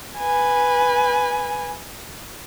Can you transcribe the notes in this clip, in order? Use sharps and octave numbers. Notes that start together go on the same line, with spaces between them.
B4 G#5